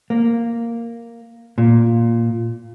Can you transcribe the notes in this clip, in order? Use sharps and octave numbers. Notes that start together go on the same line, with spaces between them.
A#3
A#2